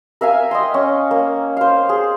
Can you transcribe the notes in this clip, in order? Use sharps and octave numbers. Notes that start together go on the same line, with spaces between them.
A#4 E5 F5 G#5
D#5 G5 C6
C#4
A#3
C5 F5
G#4